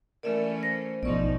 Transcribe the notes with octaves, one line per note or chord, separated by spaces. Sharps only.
E3 A3 C#4 A#4 D5 E5
C5 A#6
A#1 G#2 B2 F3 B3 D#4 D5 C#6